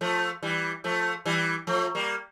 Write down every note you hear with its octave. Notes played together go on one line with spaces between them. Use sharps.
F3 A3
E3 G3
F3 A3
E3 G3
F3 A3
G3 A#3